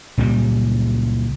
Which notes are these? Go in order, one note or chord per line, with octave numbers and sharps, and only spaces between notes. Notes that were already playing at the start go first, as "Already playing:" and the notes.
C#2 A#2 C#3 G3